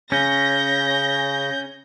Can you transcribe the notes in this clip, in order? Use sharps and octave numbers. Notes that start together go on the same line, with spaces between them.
C#3 C#4 G6 A#6